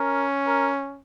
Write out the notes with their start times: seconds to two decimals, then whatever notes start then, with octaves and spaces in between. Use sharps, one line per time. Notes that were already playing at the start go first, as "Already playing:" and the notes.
Already playing: C#4 A#4
0.46 A#4